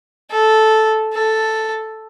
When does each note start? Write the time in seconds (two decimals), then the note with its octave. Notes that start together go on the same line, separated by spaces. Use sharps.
0.31 A4
1.13 A4